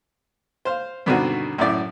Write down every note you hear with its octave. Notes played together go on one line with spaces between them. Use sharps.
C5 F5
G2 B2 D3 D#3 C4 F#4
F#2 A2 D5